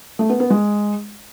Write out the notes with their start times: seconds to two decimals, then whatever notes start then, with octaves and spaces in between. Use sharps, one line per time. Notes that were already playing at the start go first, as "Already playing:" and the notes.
0.19 A3
0.30 B3
0.40 B3
0.50 G#3